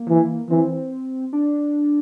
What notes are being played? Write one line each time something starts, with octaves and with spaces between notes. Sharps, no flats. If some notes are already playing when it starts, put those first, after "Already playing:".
Already playing: A#3
E3
E3 C4
D4